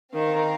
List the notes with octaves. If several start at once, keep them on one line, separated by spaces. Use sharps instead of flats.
D#3 C4 D#4 A#4 F5